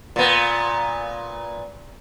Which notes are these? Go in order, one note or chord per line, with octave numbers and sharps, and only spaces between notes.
A#2 B3